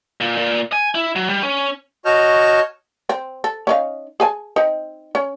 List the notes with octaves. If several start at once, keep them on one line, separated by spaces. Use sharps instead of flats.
A#2
A#2
G#5
E4
F#3
G3
C#4
F#4 C#5 D#5 A5 F6 G6
C4
A4
C#4 D#4 F5
G#4 G#5 A5
C4 D#4
C#4